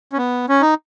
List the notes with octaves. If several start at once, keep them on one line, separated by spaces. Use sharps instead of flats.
C#4
B3
C#4
D#4